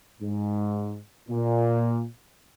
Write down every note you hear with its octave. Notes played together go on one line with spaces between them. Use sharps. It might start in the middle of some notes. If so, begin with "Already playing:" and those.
G#2
A#2